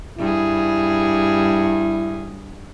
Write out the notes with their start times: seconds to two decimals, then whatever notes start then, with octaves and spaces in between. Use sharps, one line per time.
0.19 G2 E4 G#4